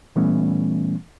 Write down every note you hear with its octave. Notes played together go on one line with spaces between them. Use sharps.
A#2 E3 G3 A3 B3 C#4